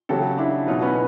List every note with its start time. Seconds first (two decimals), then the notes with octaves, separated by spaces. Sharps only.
0.09 C#3 F#3 G4 A4
0.38 D4 E4
0.67 B2 F#3 D#4 F4
0.82 B3 C#4